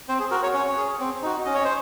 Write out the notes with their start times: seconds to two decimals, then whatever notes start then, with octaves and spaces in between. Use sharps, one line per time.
0.09 C4 C5
0.20 G#4
0.31 F#4 A#4
0.43 C#5
0.54 C#4 C#5
0.77 G#4
1.00 C4
1.22 D#4 F#4
1.45 C#4 D#5
1.54 C#5
1.64 C5